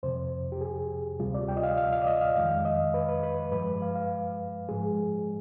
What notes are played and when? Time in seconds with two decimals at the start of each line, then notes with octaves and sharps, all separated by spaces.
0.03 F2 C3 F3 C5
0.52 G4
0.61 G#4
1.19 D2 C3 G3 F4
1.34 D5
1.49 G5
1.57 D#5
1.63 F5
1.77 F5
1.93 F5
2.02 D5
2.07 D#5
2.21 F5
2.36 F2 D#3 G#3 F5
2.51 F5
2.65 D#5
2.94 B4
3.09 B4
3.23 B4
3.52 G2 F3 G#3 B4
3.82 F5
3.96 F5
4.69 G#2 F3 G#3 G#4